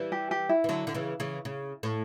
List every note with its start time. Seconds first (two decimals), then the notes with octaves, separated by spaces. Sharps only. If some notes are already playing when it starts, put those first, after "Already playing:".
Already playing: E3 G3
0.12 G4
0.31 G4
0.49 E4
0.64 E3
0.69 D3 F#3
0.87 D3
0.94 C#3 E3
1.20 C#3 E3
1.45 C#3
1.83 A2